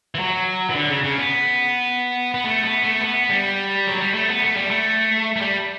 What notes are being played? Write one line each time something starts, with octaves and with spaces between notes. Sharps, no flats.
E3
F#3
E3
D3
C#3
C#3
B3
B3
A3
B3
A3
B3
G3
F#3
G3
A3
B3
A3
G3
A3
A3
G3